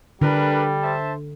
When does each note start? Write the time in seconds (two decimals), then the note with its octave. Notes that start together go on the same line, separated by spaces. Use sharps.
0.21 D3 G3 D4 A#4 B4
0.82 C5 E5 A5